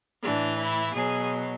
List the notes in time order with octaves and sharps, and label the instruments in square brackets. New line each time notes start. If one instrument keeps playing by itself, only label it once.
[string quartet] A2 E3 D4
E4
B2 F#3 G#4